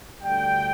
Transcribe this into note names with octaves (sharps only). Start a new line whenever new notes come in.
D2 D3 G3 G5